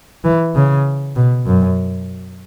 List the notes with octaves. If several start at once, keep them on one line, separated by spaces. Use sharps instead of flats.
E3
C#3
B2
F#2